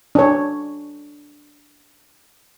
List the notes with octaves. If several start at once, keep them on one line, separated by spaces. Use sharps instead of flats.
D4 C#5